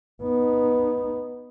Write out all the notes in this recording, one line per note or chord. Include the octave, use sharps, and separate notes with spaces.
B3 D#4